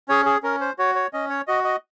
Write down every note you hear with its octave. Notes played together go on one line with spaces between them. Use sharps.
C#4 G#4 C#5
G#4
C#4 A#4
C5
F#4 C#5
C#5
C#4 D#5
C#5
F#4 D#5
D#5